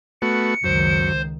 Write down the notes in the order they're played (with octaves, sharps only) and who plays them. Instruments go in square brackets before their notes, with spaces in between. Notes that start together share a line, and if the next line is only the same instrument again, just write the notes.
[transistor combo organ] A3 B3 F#4 [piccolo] C#7
[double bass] C#2 D#3 [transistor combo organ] F#2 [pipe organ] C5